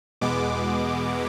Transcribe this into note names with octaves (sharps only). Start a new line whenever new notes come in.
E2 B2 G#3 B3 D6